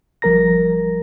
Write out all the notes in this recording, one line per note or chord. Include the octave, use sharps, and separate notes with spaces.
G#1 F3 G3 A#4 A#5 A#6